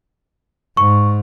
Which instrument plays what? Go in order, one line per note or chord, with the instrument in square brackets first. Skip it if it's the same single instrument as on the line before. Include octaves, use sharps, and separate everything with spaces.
[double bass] G#2 [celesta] C#6